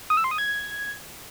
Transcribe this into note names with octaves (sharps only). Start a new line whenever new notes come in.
D#6
E6
C6
D#6
G#6